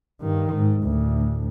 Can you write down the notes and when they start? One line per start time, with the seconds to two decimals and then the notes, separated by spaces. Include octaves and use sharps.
0.21 G2 D#3
0.55 G#2
0.84 D2 A2